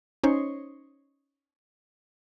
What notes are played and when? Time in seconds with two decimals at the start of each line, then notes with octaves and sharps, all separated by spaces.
0.24 C#4 D#4 C5 C#5